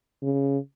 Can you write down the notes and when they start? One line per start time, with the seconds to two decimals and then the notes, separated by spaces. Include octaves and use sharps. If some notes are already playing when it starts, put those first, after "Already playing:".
0.23 C#3